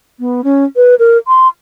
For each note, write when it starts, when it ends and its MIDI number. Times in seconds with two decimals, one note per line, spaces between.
0.20 0.41 59
0.44 0.65 61
0.76 0.95 71
0.99 1.18 70
1.28 1.48 84